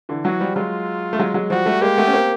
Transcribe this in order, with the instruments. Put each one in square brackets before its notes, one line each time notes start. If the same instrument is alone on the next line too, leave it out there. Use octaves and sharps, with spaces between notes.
[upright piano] D3 E3
[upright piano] E3 F#3 [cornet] F#4
[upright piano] F3 G3
[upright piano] F#3 G#3 [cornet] F4
[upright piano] A3
F#3 G#3
F#3 G#3
[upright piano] F3 G3 [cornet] F#4
[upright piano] G3 A3
[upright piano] G#3 A#3 [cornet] G4
[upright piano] A3 B3
C#4
A#3 C4